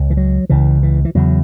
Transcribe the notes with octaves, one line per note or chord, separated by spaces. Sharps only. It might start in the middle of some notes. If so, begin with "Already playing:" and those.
Already playing: C#2 C#3
E3
F#3
C#2 C#3 E3
E3
E3
E2 C#3 F#3